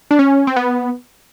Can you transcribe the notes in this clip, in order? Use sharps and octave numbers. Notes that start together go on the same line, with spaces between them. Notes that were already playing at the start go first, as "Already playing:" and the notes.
D4
C#4
C4
B3